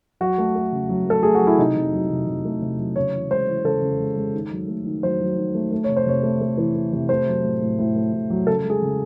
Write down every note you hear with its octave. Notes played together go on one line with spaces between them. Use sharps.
F#3 F#4
A3
A3
C#3
F#3
A3 A4
A3 G#4
F#4
F#3
E4
C3 D#4
C3
F#3
C3
C3
A3
C3
F#3
C#3 C#5
E3
G#3 C5
E3
C#3 A4
C#3
G#3
G#3
D#3
F#3
A3
D#3
F#3 C5
F#3
D#3
A3
A3
C3 C#5
C5
C3 C#5
A3
A3
E3
A3
C3
A3 C5
F#3
A2
A2
A2
A3
A2
F#3
C#3 A4
G#3
G#4
C#3